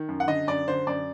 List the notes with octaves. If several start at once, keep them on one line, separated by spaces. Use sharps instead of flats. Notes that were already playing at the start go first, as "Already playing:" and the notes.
Already playing: D#3
F#2
F#5
D3 D#5
F#2 D5
D3 C5
F#2 D5